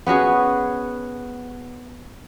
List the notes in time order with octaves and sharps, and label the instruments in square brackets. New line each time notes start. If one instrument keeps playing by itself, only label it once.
[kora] B3 C#4 F#4 G#4